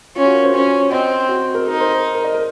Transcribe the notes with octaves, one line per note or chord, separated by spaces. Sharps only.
C#4 F4
F#4
A#4
C5
C#4 C#5
C4 D#5
F#4
A#4
D#4 A#4
C5
A#4
A#4
D#5
A#4